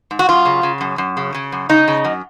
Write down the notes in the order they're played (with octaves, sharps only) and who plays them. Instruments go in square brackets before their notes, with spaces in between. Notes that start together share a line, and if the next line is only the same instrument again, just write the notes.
[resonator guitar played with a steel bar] G#2
F#4
F#2 F4
C#3
C#3
F#2
F#2
C#3
C#3
F#2
C#3 D#4
C#3
F#2